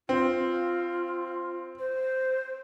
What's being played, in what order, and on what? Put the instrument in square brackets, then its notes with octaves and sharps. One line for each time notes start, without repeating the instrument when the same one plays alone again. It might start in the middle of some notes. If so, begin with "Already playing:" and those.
[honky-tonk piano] C4 [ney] F4
[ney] C5